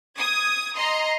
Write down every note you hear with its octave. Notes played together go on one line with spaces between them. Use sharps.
D#6 G#6
D#5 A#5 C6